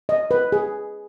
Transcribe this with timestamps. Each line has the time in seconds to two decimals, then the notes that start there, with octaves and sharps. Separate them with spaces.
0.09 D#5
0.31 B4
0.52 G#4